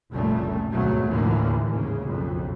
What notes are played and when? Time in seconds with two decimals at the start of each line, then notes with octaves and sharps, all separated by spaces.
0.13 F1 C2 A#2 C#3 G3 A3
0.72 G#1 D2 B2 F#3 A3
1.09 D#2 A2 D3 E3 F3 A#3
1.71 G#2 C#3
2.04 B1 F2